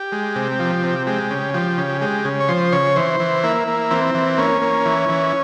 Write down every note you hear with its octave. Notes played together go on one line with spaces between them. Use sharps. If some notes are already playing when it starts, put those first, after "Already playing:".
Already playing: G4
G#3
C3
F3
C3
G#3 G4
C#3
F3 G4
C#3
G#3 G4
C#3
C#5
F3 C5
C#3 C#5
E3 C5
E3
A#3 E4
A#3
E3 C4
E3
A#3 C#4
A#3
E3
E3